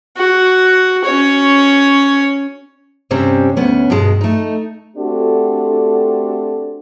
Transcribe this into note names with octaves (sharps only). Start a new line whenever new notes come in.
F#4
C#4 C#5
G2 C3 G3 C4 C#4
D2 B3 C#4
G2 B2 G#3
A3 D#4
A3 C4 D4 F#4 G4 A4